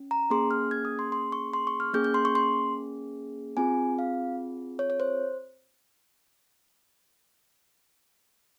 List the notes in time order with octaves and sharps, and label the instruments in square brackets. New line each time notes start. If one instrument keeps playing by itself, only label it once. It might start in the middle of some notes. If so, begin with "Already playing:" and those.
Already playing: [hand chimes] C#4
A#5
A#3 C#4 G#4 C6
F6
G#6
D#6
C6
C6
C#6
C6
C#6
F6
A#3 C#4 G#4 G6
G6
C6
C#6
C6
C4 F4 G#4 G#5
F5
C#5
C#5
C5